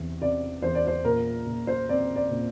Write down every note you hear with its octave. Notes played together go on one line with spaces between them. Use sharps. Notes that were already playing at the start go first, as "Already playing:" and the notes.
Already playing: E2 C3
C3 D5
E2 C5
D5
C5
A#2 A#4
A#2
C5
C4 D5
D5
A#2